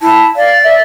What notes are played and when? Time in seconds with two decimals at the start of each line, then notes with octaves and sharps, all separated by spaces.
0.01 E4 A5
0.36 D5 F5
0.64 E5